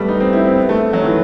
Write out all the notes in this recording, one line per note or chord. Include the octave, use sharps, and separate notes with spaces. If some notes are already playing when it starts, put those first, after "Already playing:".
Already playing: G3 A3 B3
D#4
C4
E4
C4
B3
A3
F#3
D#3
E3